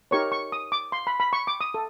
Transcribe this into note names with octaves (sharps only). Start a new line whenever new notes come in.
D#4 G4 A#4 C#5 C#6
C#6
D#6
D6
C6
B5
B5
C#6
D6
D#6
A4